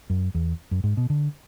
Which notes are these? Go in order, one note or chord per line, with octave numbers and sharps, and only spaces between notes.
F#2
E2
F#2
G#2
B2
D3